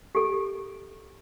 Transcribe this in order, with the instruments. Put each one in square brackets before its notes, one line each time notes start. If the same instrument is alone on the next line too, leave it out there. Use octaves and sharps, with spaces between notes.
[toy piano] G4 A4